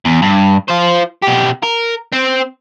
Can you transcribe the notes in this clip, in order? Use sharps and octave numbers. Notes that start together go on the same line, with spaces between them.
E2
G2
F4 C5
B2 G4
A#4
C4